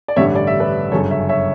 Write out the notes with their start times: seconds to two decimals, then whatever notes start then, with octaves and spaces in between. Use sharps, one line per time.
0.08 D5
0.16 A1 G2 D3 G3 C#5 E5
0.36 D5
0.47 E5
0.60 B4 D5
0.92 G1 F#2 C#3 A4 C#5
1.11 C#5 E5
1.29 C#5 E5